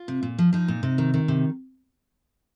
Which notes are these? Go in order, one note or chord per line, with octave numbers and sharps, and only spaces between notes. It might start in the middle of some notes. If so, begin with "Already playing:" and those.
Already playing: F4
C3
A#2
F3
F3 D#4
A#2
C3
D#3
D#3
C3